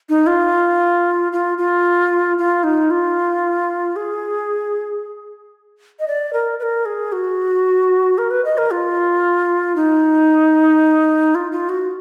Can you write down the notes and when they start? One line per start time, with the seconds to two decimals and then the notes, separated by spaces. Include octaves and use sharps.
0.09 D#4
0.27 F4
1.32 F4
1.58 F4
2.38 F4
2.64 D#4
2.91 F4
3.96 G#4
5.99 D#5
6.08 D5
6.33 A#4
6.59 B4
6.63 A#4
6.86 G#4
7.12 F#4
8.18 A#4
8.31 B4
8.45 D#5
8.58 A#4
8.71 F4
9.76 D#4
11.35 F4
11.52 F4
11.69 F#4